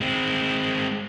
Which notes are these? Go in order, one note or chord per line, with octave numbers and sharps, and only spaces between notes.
G#3 C4